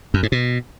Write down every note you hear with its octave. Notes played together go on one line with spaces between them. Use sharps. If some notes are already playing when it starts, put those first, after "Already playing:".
F#2
G#2
B2